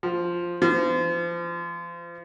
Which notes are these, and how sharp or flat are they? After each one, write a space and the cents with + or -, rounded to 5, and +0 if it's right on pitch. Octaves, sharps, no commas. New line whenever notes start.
F3 +0
F3 -30